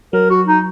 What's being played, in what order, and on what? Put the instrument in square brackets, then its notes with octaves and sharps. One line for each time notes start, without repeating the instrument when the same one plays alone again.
[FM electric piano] F#3 [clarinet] A#4
[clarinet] F#4
D#4